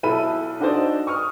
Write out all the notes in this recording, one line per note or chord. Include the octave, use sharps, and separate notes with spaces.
B1 E4 A4 B5 D#7
D4 D#4 F#4 A4 C5 D5
C#6 D#6 F6